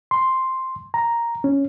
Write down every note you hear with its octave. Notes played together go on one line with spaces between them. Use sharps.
C6
A#5
C#4